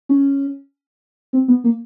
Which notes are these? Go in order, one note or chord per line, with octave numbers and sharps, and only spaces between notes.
C#4
C4
B3
A#3